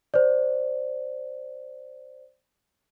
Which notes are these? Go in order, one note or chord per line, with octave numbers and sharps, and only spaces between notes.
C5 D5